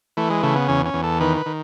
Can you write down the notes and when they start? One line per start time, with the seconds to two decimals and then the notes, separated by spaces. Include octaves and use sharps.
0.17 E3 A3
0.30 G#3
0.43 C#3 A3
0.56 B3
0.69 E2 C#4
0.86 C#4
0.94 E2
1.03 A4
1.20 D#3 B4
1.37 B4
1.46 D#3